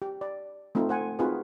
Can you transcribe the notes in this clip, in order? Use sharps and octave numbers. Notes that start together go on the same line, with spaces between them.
G4
D5
A3 C4 D#4 F4
C5 F#5 G#5
C4 D#4 F4 F#4 G#4 B4